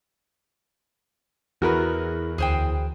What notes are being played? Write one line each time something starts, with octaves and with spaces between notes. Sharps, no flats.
E2 E4 F#4 G#4 A#4 B4
D2 G#4 C5 G5